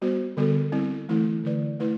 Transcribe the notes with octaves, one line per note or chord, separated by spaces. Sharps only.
G3 B3 F#4 C5
D3 G3 B3 F#4 A4
G3 C4 E4
E3 A3 E4 A4
D3 A3 E4 B4 D5
A3 E4 B4